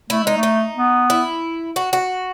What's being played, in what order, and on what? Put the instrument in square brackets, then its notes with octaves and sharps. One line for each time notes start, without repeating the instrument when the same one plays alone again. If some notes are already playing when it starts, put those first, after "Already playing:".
[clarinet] A3 [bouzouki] E4
[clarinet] G#3 [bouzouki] D#4
[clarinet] A3
[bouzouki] D#4
[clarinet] B3
[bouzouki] E4
F#4
F#4